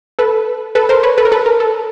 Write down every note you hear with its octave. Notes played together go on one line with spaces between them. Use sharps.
A4 B4
A4 B4
A#4 C5
B4 C#5
A4 B4
A#4
A4 B4
A#4
A4